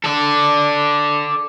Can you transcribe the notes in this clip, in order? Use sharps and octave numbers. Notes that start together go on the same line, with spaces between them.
A4 D5